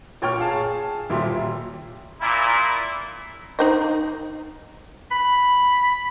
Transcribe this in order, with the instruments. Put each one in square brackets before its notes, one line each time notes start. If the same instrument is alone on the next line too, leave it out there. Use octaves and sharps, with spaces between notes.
[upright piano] A#2 C#5 G5 C#6 F6
G#4 F5 A5
D#1 B1 A#2 G4 E5 C6
[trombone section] A#2 E4
[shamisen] D#4 C5 D#5
[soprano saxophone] B5